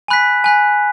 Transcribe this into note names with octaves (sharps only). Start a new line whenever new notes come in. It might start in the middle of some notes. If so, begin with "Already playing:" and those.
G#5 B5 F#6 B6
G#5 B5 F#6 B6